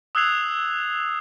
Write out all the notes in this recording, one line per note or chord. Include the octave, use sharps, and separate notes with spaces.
D#6 E6 F#6 G#6 C7 F7